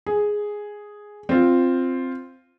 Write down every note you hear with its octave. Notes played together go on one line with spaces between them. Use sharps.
G#4
C4 F4